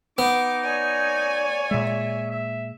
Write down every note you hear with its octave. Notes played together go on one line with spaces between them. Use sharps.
B3 D#4 D6
C#5 D5 G#5
A#2 G#3 E5
E5